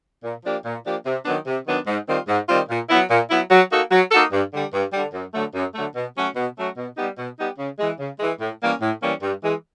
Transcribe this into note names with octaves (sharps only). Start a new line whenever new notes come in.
A#2
F3 A#3 D4 G4
A#2
F3 A#3 D4 G4
C3
D#3 F#3 B3 D4
C3
D#3 F#3 B3 D4
G#2
D#3 G3 C4 F4
G#2
D#3 G3 C4 F4
A#2
F#3 B3 E4
A#2
F#3 B3 E4
F#3
A#3 D#4 F#4 A4
F#3
A#3 D#4 F#4 A4
G2
D3 G3
G2
D3 G3
F#2
D3 F#3 A3
F#2
D3 F#3 A3
B2
F#3 A3 C#4 F#4
B2
F#3 A3 C#4 F#4
B2
G3 B3 D#4 G4
B2
G3 B3 D#4 G4
C#3
E3 G#3
C#3
E3 G#3
A2
E3 G3 A#3 C#4
A2
E3 G3 A#3 C#4
G2
E3 G#3